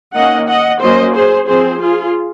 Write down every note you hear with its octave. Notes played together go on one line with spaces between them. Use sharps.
D#3 A#3 C#4 D#5 F#5
D#5 F#5
F#3 A#3 C#4 C5 D#5
G#4 C5
F3 C4 G#4 C5
F4 G#4